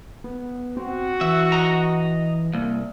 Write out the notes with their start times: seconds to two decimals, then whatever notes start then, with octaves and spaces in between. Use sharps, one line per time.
0.24 B3
0.77 C4 F#4
1.21 E3 E5
1.52 D#5 A#5
2.54 C2 A#3